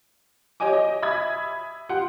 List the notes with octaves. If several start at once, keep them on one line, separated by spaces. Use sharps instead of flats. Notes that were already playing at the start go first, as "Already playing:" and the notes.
G4 C#5 D#5 G#5 D6
D#5
E5 B5 D#6 G#6
F4 G4 F#5 C6